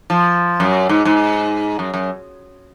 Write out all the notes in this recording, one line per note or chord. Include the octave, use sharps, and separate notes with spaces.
F3
F#2
G#2
G#2
F#2
F#2